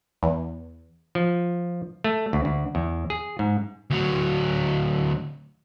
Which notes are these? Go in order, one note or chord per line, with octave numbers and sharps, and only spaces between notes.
E2
F3
A3
D2
D2
E2
G#4
G#2
D2 F#3